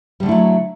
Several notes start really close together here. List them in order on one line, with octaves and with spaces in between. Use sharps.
G3 D3 A3 E4 F#3